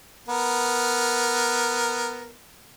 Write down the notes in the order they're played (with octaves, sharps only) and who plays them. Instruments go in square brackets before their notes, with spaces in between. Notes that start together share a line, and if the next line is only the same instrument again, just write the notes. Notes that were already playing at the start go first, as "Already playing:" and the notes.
[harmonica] B3 A#4